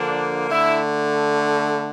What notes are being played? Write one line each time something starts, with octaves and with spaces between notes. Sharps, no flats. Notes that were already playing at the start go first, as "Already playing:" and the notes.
Already playing: D3 F3 A#3 D4
D3 A3 E4